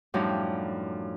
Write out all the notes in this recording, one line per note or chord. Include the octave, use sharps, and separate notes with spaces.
F#2 A2 F3 G3 D4 D#4